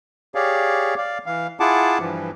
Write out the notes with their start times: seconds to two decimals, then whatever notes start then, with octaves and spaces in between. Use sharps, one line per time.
0.35 G4 G#4 C#5 D5 F5
0.97 D5 F5
1.26 E3 F5
1.60 E4 F4 G#4 F#5 A5 D6
1.99 G2 E3 F3